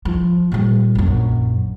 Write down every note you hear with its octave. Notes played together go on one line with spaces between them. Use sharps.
F3
A#2 G3
A#1 F#2